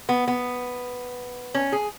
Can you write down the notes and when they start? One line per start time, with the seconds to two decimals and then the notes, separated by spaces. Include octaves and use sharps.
0.09 B3
0.28 B3
1.55 C#4
1.72 G#4